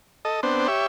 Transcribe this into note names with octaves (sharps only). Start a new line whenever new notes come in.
A4 D#5
B3 C4 D4 C5
G4 C#5 E5